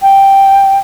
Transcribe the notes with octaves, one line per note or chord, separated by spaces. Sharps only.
G5